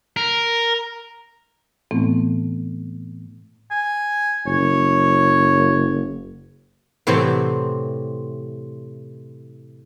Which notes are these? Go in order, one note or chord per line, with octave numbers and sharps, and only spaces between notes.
A#4
A2 E3 A3 B3 C4 E4
G#5
F#1 C#5
A2 C3 E3 F#3 C4 G4